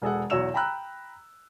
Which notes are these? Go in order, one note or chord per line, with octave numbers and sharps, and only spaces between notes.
E1 G#4 A4 F#5
B1 E2 F#4 C#5 E6 E7
G5 A#5 B5 E6 F#6